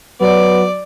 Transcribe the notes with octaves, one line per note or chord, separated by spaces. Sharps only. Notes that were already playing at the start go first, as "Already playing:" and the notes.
F#3 B3 D5